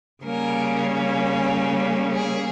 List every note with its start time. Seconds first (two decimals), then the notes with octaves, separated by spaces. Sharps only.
0.24 C#3 G3 A#3 C#4 A#4
2.12 G#4